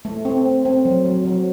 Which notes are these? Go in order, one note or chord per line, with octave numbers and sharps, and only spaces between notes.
A3
C4
C4
C4
F#3
F#3
F#3